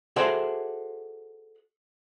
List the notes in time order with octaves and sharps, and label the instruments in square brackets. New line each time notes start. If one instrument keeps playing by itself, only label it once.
[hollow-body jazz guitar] F#4 G#4 A4 C5 D5 E5